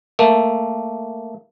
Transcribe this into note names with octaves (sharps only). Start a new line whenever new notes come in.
A3 A#3